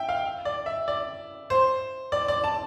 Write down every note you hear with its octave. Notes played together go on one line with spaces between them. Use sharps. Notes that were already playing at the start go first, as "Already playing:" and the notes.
Already playing: E5 G5
F5
D5
E5
D5
C5
D5
D5
A5